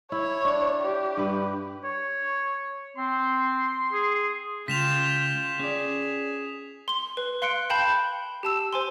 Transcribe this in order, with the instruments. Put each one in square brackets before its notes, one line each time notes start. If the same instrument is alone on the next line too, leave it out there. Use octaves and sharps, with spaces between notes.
[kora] E4 [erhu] C#5
[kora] D4
[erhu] G4
[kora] G2 B4
[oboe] C#5
[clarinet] C4 [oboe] C6
[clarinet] G#4
[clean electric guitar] C#3 G#3 [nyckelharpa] F4 G5 [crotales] B6 E7 F7
[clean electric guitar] C#4 D5 [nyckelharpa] G#4
[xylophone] C6 G7
B4
F5 C6 F#6 C#7 D7
F5 G5 A5 B5 G6
G4 A5 E6
C5 G#5 C6